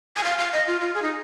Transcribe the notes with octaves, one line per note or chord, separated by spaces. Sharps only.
G#5
F5
F5
D#5
F4
F4
G#4
D#4